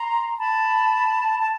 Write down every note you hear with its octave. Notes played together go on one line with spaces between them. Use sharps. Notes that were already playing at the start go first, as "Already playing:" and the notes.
Already playing: A#5 C6
A5 B5
A5